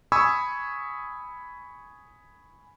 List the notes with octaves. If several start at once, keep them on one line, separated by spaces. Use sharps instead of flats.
G#5 B5 C#6 D#6 E6 G#6